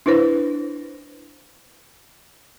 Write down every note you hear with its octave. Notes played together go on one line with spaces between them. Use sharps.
D4 E4 B4 C5